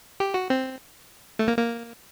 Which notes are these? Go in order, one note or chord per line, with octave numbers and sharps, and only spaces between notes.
G4
F#4
C4
A3
A#3
A#3